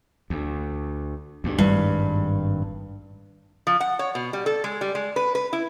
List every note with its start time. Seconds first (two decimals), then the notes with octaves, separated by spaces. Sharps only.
0.30 D2
1.44 D2 G2
1.58 G#1 G2
3.67 F3
3.80 F#5
3.99 C#5
4.15 B2
4.33 G3
4.46 A4
4.64 G#3
4.81 G3
4.95 G#3
5.16 B4
5.35 B4
5.53 E4